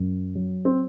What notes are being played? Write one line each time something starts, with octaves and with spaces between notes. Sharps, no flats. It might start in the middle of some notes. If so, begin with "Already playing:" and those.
Already playing: F#2
F#3
C4